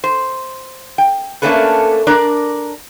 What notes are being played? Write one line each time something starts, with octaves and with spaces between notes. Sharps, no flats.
C5
G5
A3 A#3 C#4 D4 A4 B4
D4 A#4 D5